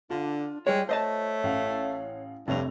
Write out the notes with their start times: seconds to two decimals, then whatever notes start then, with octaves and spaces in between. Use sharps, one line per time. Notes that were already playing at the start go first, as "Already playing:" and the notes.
0.10 D3 D4 F4
0.67 G3 G#3 C#5 G5
0.89 A3 C5 C#5 D#5 A5
1.43 A1 F5 F#5
2.48 F1 G2 C3 C#5 F7